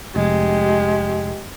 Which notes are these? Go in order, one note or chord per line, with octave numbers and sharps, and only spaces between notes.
F1 G#3 G4